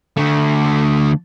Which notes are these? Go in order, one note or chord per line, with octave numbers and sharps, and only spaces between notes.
D3 A3